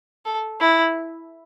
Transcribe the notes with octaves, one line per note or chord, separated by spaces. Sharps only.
A4
E4